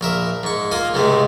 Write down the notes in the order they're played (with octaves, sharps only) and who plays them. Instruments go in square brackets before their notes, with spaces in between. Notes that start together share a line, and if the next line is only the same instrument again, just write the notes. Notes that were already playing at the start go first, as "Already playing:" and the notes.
[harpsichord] A#1 A#4 E5
G#2 C#6
A#3 F4 G#5 D#6
C#2 G#2 C3 G#3 A3